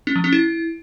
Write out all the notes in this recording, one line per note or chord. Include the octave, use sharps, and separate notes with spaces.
C#4
F3
C#4
E4